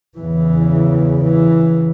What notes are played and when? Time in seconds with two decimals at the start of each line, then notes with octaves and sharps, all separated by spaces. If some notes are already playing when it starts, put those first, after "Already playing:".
0.18 E2 C#3 E3
1.22 E3